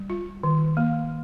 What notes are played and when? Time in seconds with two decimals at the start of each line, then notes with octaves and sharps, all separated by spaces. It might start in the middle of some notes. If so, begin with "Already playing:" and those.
Already playing: G3
0.10 F4
0.43 D#3
0.77 A#3